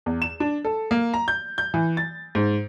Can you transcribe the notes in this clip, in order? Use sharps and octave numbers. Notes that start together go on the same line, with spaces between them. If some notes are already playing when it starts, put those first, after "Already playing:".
E2
E7
D4
A4
A#3
A#5
G6
G6
E3
A6
G#2